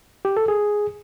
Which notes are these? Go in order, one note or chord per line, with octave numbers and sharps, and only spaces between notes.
G4
A4
G#4